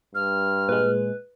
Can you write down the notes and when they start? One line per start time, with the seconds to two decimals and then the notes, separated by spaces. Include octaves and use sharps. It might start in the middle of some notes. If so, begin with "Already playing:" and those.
0.15 G2 F6
0.69 A#2 G#3 B4